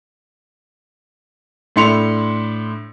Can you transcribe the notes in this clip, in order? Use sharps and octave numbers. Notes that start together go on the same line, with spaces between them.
A2 D4 E4 C6 C#7 F7